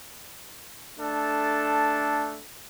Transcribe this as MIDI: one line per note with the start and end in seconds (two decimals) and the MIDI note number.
0.99 2.41 57
0.99 2.41 62
0.99 2.41 69
0.99 2.41 81